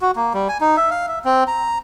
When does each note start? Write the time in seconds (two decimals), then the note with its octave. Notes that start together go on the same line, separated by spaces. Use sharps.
0.02 F#4
0.16 A#3
0.34 G3
0.49 G#5
0.61 D#4
0.77 E5
0.91 F5
1.08 E5
1.25 C4
1.48 A#5